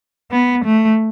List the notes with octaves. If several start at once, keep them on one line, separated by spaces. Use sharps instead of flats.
B3
A3